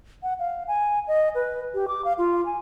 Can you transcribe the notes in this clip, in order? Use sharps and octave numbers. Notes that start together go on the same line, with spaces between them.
F#5
F5
G#5
D#5
B4
G4
D6
F5
F4
G#5